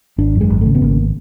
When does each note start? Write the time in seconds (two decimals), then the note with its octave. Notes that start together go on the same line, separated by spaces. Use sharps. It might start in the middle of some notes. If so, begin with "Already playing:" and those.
0.18 G#1 D4
0.35 F#2
0.41 G#3
0.50 G#1
0.61 C#3 A3
0.75 B3
0.82 G#1 A#3